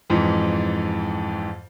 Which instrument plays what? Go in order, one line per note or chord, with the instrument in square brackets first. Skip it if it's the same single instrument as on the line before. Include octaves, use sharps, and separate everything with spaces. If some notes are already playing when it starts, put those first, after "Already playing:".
[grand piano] F2 G#2 E3